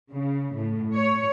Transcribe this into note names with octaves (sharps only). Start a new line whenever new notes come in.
C#3
A2
C#5